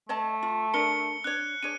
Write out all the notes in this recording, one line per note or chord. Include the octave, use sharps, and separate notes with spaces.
A3 C#5 D#5 A5
F4
D4 A#4 A#5 C#7 G7
D4 C#5 F#6
D4 G#4 C#5 D#7